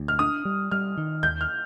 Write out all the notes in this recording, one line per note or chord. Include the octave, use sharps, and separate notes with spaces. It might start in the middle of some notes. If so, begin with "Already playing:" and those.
Already playing: D2
F6
D4 D#6
G3
G3 F6
D#3
D#2 G6
F6